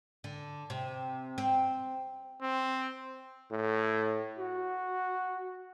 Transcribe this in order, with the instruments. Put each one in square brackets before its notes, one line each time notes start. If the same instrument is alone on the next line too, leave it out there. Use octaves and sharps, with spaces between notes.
[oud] D3
C3
C4
[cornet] C4
[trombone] A2
F#4